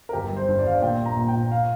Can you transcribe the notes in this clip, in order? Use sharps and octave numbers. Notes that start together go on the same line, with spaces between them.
A#4
G1 G4
G3
C5
G2
D5
G1 F5
D5
A#2 G5
A#1
A#5
A#1
G5
A#2
F5